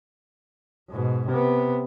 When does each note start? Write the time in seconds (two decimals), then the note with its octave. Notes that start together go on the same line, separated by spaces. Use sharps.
0.90 G#2 B2
1.27 C3 B3